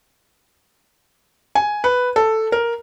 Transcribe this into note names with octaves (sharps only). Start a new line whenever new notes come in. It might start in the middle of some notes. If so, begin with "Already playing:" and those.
G#5
B4
A4
A#4